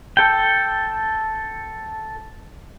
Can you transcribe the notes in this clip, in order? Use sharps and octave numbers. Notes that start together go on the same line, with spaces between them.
A4 G5